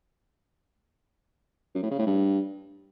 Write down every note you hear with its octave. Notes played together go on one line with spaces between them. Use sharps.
F#2
A2
C#3
A2
G2